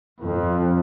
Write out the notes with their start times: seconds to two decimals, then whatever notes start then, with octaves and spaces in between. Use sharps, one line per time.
0.20 F2